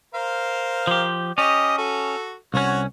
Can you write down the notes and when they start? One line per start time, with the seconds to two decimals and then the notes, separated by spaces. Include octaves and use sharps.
0.14 A#4 C5 F5
0.87 F3 G4
1.38 C#4 G4 D#5
1.78 F#4 A4
2.54 C2 C#4 F#4 C#5 F#5